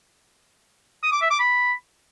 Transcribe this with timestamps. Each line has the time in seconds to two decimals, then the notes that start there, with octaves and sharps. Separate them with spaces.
1.03 D#6
1.12 D6
1.21 E5
1.30 D6
1.40 B5